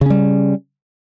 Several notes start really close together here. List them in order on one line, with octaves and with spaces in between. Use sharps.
C#3 C#4 G3